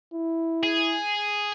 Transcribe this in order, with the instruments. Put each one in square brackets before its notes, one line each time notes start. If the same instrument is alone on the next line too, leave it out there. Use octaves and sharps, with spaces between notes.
[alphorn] E4
[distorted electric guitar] G#4